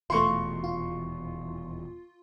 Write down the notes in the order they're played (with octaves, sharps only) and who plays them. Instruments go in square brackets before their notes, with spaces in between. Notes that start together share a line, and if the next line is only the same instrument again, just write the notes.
[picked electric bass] D#1 E2 B2 [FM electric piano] A3 F4 [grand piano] C6 C#6
[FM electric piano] F4